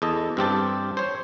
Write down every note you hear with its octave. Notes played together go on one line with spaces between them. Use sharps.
E2 A4 D#5
G2 C4 G4 A5
C5 C#5